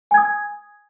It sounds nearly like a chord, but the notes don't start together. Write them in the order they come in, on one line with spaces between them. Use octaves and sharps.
G#5 G#6 D#6